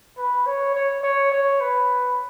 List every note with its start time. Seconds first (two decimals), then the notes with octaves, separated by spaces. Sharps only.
0.18 B4
0.46 C#5
0.74 C#5
1.03 C#5
1.32 C#5
1.61 B4